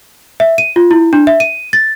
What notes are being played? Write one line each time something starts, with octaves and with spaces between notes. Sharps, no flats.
E5
D#7
F4
E4
D4
E5
D#7
A6